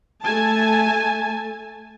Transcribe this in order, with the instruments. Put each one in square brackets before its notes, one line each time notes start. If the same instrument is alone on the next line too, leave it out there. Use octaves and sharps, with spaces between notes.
[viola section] A3 G#5 A5